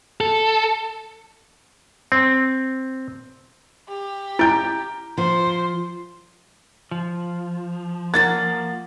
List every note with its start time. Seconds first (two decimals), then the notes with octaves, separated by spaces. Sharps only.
0.21 A4
2.12 C4
3.89 G4
4.39 E4 A#5 G6 D7
5.18 F3 C5
6.91 F3
8.14 A#3 F4 F#4 A6